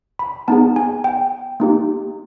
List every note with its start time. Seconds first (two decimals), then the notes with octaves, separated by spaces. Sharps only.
0.19 B5
0.48 B3 D#4 G#4 A5
0.76 G#5
1.04 G5
1.60 A#3 D#4 G4